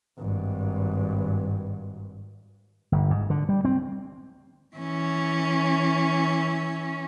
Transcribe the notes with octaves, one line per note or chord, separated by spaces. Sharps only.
G#1 G2
G1
G#2
D3
G3
C4
E3 C#4